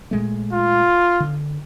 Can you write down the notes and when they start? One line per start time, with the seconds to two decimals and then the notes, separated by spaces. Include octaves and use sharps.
0.11 A#2 G#3 A3
0.52 F4
1.20 D3